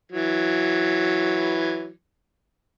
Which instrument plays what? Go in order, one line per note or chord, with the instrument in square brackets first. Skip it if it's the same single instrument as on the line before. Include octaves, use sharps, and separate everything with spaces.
[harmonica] E3 F#3